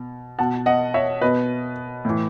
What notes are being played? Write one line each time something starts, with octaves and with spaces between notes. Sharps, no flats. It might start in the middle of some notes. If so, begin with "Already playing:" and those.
Already playing: B2
B2 F#5 A5
D#5 F#5
C#5 E5
B2 B4 D#5
A2 E3